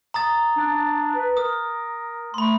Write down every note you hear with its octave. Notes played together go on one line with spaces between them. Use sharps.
A#5 D#6 A6
D4
B4
A#4 D#6
A3 B5 C6